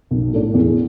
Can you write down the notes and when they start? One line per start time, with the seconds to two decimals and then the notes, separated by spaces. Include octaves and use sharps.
0.11 B1
0.33 A2 A3 D4
0.54 E2